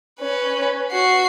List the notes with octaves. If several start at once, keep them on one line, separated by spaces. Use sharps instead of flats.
C#4 B4
F#4 C7